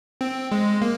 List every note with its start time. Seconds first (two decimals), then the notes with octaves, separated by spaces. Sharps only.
0.21 C4
0.52 G#3
0.82 A#3